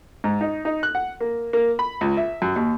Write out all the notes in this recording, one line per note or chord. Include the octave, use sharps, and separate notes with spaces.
G#2
D#4
D#4
F#6
F#5
A#3
A#3
B5
C#2
E5
F#2
D#2